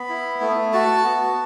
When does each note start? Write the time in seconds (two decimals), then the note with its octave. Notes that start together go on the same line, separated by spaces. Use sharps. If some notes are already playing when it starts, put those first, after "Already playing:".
Already playing: B3 B5
0.09 E4
0.41 A3
0.73 F#4 A5
1.05 B3